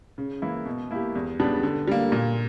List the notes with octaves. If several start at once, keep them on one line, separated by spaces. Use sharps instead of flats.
C#3
E3 A#3 E4
B2
A#3 E4 G4
E2
C#3 G3 B3 D4
D3
G3 A#3
A#2